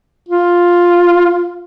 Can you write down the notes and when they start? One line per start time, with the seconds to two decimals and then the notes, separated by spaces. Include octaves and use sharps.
0.29 F4